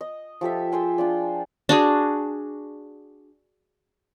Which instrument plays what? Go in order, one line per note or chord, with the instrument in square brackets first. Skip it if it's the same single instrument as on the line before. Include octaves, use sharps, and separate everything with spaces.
[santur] D#5
F3 G4 A4 E5
G#4 C5 G5 G#5
D4 F4 D5
[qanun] D4 F#4 G#4